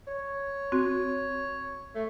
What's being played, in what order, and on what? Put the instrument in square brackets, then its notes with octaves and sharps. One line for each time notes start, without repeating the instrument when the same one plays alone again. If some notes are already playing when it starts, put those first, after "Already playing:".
[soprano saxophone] C#5
[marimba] C4 F#4
[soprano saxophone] A3